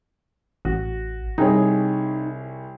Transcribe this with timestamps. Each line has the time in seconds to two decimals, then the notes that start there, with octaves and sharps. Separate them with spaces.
0.65 A1 F#4
1.38 C2 D#4 G#4 C#5